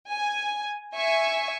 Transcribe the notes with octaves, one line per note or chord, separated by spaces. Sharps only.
G#5
E5 G#5 C#6